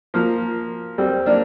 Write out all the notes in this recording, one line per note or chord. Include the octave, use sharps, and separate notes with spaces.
F3 A#3
G3 C4
A#3 D4